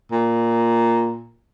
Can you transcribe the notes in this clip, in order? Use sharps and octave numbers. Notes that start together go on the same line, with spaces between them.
A#2